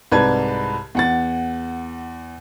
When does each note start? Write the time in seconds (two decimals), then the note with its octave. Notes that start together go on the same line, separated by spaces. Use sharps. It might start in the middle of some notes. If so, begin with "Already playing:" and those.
0.12 C2 G#2 B4 D5 A5 G#6
0.95 E2 F#5 A6